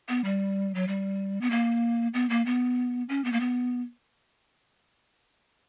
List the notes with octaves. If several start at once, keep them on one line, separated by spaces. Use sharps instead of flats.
B3
G3
F#3
G3
B3
A#3
B3
A#3
B3
C#4
B3
A#3
B3